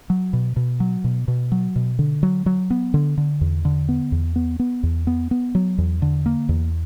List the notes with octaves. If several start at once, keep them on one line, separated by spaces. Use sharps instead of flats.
F#3
B2
B2
F#3
B2
B2
F#3
B2
D3
F#3
F#3
B3
D3
D3
E2
D3
B3
E2
B3
B3
E2
B3
B3
F#3
E2
D3
A#3
E2